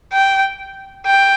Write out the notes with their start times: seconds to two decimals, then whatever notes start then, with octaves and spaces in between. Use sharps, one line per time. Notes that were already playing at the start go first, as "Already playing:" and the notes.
0.13 G5
1.06 G5